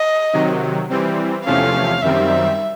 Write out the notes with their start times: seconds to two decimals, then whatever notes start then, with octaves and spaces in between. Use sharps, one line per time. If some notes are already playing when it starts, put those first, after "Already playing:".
Already playing: D#5
0.33 C3 D#3 F#3
0.90 E3 G3 C4
1.45 E2 C3 F3 A3 C#4 F5
2.02 F#2 D#3 G3 C4 E5